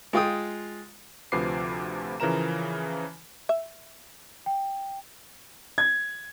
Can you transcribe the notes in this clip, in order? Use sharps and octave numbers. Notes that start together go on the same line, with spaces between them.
G#3 F4 G5 D#6
D2 C3 F3 B4 D6 C7
C#3 E3 F3 A#4 A#5 E7
E5
G5
G#6